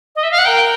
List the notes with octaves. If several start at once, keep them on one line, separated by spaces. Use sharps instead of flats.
D#5
E5
F5
F#5
A#4 G5